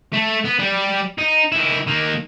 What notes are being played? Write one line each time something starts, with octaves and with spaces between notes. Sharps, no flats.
A3
B3
G3 G4
D#4
D#3 E4
D#3 A#3